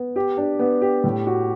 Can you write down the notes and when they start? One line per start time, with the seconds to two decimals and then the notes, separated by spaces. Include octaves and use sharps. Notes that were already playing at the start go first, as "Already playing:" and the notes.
Already playing: B3
0.16 G4
0.37 D4
0.59 B3
0.81 G4
1.04 A2
1.27 F#4